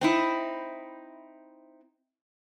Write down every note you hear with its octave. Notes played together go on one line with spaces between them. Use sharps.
C4 D#4 E4